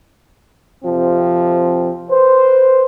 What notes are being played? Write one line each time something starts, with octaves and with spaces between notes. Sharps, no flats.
F2 C3 F3 C4
B4 C5